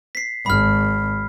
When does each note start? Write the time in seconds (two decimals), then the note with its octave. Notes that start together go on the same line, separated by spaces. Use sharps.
0.15 B6 C7
0.46 G#1 B5 F6